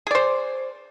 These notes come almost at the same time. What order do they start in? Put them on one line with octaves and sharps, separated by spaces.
G#4 D5 C5